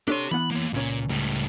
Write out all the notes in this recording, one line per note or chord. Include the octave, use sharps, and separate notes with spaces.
D4 G4 A4 C#5 C6
E3 B3 F#5 B5
A#3 C#5
C#2 A#2 C#4
C#2 A2 G3